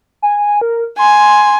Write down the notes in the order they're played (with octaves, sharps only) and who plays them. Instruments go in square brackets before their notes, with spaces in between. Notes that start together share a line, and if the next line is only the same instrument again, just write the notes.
[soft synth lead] G#5
A#4
[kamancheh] G#5 [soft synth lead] C6